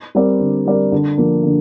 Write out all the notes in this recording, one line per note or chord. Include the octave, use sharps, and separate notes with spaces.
G3 C4 A#4 D5
D3
G3 C4 A#4 D5
D3
F3 A#3
D3